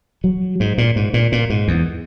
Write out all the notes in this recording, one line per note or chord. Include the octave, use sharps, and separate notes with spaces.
F#3
G#2
A#2
G#2
A#2
A#2
G#2
E2